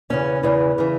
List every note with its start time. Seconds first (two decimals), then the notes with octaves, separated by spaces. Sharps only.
0.10 E2 C#3 E3 C#4
0.43 E2 C#3 E3
0.78 C#3 E3